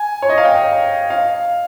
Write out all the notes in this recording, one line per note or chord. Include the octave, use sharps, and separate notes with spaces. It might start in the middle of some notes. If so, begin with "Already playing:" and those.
Already playing: G#5
C#5
D#5
F5
G5
F5